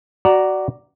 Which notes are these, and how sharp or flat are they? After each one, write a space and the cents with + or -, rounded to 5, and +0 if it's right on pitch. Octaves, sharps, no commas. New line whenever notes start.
F#4 +15 D5 +0 A#5 +0